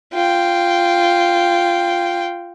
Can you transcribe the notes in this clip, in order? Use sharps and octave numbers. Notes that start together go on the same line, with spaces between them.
F4 G5